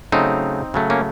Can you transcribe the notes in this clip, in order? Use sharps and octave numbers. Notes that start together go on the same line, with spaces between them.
C#3 F#3 A3 C4 D#4
C#3 F#3 A3
A#3 C#4